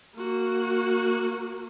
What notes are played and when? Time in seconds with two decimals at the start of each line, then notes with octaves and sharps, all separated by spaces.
0.15 A#3 F#4